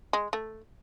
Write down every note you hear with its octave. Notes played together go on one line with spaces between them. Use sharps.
G#3
A3